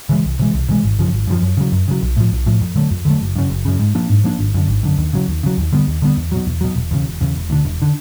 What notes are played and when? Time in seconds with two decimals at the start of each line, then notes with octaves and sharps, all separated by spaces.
0.09 C#3 E3 G#3
0.25 C2
0.39 C3 E3 G#3
0.54 C2
0.69 C3 E3 G#3
0.83 G#1
0.99 F#2 C#3 F3
1.13 G#1
1.27 F#2 C#3 F3
1.42 F#2
1.57 C#3 F#3
1.72 F#2
1.88 C#3 F#3
2.02 B1
2.16 A2 F3
2.31 B1
2.46 A2 F3
2.61 F2
2.76 D3 F#3 A3
2.91 F2
3.05 D3 F#3 A3
3.21 F#1
3.36 F#2 C#3
3.50 F#1
3.65 F#2 C#3
3.79 G#2
3.95 F3 A#3 D4
4.10 G#2
4.24 F3 A#3 D4
4.39 G#1
4.54 F#2 D3
4.68 G#1
4.83 F#2 D3
4.98 D#2
5.13 C#3 F#3
5.28 D#2
5.43 C#3 F#3
5.57 D#2
5.72 D3 G3 B3
5.88 D#2
6.02 D3 G3 B3
6.17 E2
6.32 B2 F#3
6.47 E2
6.61 B2 F#3
6.76 E1
6.91 E2 C#3
7.05 E1
7.21 E2 C#3
7.36 E1
7.50 D2 D3
7.65 E1
7.82 D3